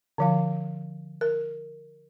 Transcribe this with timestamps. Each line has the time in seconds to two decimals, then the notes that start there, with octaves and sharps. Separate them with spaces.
0.18 D3 F3 F5
1.21 A#4